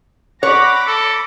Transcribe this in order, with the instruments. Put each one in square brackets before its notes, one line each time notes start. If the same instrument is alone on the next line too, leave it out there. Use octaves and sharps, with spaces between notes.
[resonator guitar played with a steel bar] C#5 [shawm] F#5 [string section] B5 D6 A#6
[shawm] A4